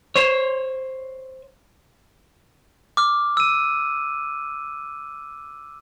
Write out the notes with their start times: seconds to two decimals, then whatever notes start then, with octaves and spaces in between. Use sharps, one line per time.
0.16 C5 C#5
2.97 D6 F6
3.37 E6 D#7